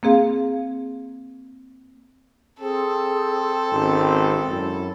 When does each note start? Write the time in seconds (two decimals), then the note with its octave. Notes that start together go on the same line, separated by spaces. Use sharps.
0.03 A#3 C4 G#4 F5
2.60 C4 G#4 A4
3.72 G#1 C#4
4.48 F#2 E4